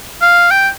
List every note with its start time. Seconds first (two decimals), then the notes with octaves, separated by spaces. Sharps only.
0.21 F5
0.51 G5